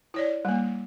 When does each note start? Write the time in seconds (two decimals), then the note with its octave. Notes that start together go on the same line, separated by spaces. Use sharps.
0.14 E4 C#5 D5
0.45 G3 A#3